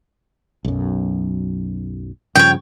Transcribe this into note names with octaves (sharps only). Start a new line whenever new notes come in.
B1 F#2
G2 C#3 F3 C#5 G5